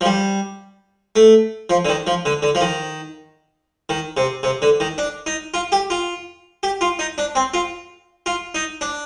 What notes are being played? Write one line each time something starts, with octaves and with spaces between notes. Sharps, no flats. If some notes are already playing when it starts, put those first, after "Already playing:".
F3
G3
A3
F3
D3
D#3
F3
D3
D3
F3
D#3
D#3
C3
C3
D3
D#3
D4
D#4
F4
G4
F4
G4
F4
D#4
D4
C4
F4
F4
D#4
D4